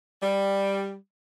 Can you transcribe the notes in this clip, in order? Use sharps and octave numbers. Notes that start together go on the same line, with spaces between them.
G3